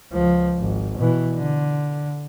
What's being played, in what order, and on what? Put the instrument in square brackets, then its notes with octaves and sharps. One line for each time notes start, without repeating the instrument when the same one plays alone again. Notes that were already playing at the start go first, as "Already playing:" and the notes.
[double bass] C#2 F3
G#1
B2 E3
D3